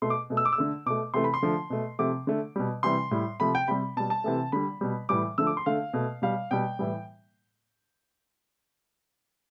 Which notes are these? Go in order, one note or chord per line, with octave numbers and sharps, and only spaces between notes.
B2 A3 C6
D6
B2 A3
E6
D6
E6
D3 A3
B2 A3 D6
C3 E3 A3 C6
B5
C6
D3 F3 A3
B2 A3
C3 F3 A3 D6
D3 A3
B2 G3
C3 E3 G3 C6
A2 G3
C3 F3 A3 B5
G5
C3 G3 B5
B2 G3 A5
A5
C3 E3 A3
D3 G3 B5
B2 G3
A2 E3 G3 D6
D3 F3 A3 E6
D6
C6
D3 A3 F5
B2 A3
B2 G3 F5
B2 G3 G5
A2 E3 G3